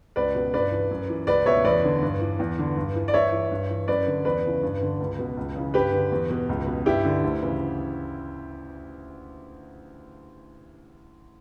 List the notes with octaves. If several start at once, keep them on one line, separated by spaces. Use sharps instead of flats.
C#2 B4 D5
B2
G2 B4 D5
E3
F#2
E3
C#2 B4 D5
B2 C#5 E5
E2 B4 D5
D3
G2
E3
E2
D3
G2
E3
D5
G2 C#5 E5
E3
G2
E3
F#2 B4 D5
D3
E2 B4 D5
C#3 E3
G2
D3
C#2
B2
C#2
C#3 E3
G2 G4 B4
D3
E2
B2
C#2
B2
G2 E4 G4
D3
D2
C#3 E3